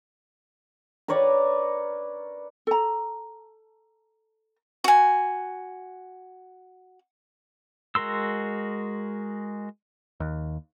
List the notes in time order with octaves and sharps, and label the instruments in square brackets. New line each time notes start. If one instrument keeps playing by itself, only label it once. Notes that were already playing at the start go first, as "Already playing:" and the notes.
[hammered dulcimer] A#4 B4 C#5 D5
[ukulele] A4 A#5
[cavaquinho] F#4 G#5
[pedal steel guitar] G#3 F#4 A#4 C6 E6
[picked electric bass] D#2